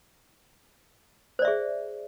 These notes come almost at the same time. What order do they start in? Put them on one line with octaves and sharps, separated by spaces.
C5 D5 E5 G#4